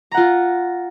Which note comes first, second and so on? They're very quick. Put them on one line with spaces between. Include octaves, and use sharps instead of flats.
A#5 F#5 F4